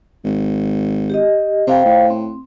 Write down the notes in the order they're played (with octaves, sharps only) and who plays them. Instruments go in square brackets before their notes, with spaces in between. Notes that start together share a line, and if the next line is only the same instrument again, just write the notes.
[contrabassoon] G#1
[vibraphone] G4 D#5
[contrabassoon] C3 [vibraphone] C5 F5 G5
[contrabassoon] A2
[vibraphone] C4